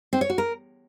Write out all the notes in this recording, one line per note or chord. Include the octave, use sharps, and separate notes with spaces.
C4
C#5
F#4
A#4